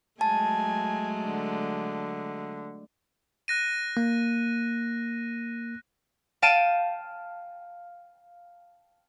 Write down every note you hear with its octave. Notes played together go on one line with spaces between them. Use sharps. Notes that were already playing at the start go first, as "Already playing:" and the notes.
F#3 G#3 A3 G#5 A5
D3
F#6 A#6 D#7
A#3
F5 G5 A5 D7 D#7